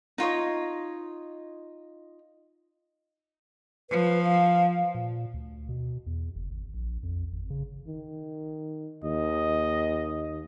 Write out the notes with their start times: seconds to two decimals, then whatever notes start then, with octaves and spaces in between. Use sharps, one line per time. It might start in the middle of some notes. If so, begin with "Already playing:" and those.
0.18 D#4 F4 C#5 D#5
3.90 F3 B4
4.24 F5
4.95 A#2
5.34 D2
5.69 B2
6.07 E2
6.36 F#1
6.51 G#1
6.74 A#1
7.03 F2
7.33 G#1
7.50 C#3
7.88 D#3
9.04 D#2 D#5